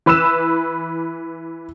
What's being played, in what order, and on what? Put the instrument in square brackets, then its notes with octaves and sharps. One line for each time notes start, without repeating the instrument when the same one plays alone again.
[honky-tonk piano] E3 B4 B5 E6 E7